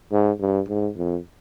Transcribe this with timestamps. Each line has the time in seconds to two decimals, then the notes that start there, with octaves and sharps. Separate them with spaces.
0.12 G#2
0.40 G2
0.69 G#2
0.97 F2